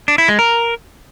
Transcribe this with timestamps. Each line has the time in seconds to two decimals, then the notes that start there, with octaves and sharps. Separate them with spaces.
0.08 D4
0.18 E4
0.28 G#3
0.39 A#4